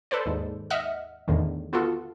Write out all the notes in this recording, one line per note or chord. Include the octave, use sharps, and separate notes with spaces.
A4 B4 C5 D5
D#2 G#2
D#5 E5 F#5 F6
E2 A2 D3 D#3
B3 F4 F#4 A4